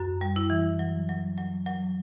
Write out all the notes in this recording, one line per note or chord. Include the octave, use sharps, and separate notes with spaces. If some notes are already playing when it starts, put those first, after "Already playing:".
Already playing: F#2 F#4
G3
E4
E3
F#3
F#3
F#3
F#3